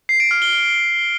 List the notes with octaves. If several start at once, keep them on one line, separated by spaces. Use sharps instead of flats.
C7
D7
F6
G7